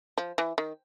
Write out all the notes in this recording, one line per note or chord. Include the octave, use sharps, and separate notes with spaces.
F3
E3
D#3